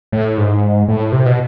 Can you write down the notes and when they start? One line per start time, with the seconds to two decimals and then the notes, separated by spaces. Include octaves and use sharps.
0.12 A2
0.38 G#2
0.88 A2
1.12 C3
1.26 B2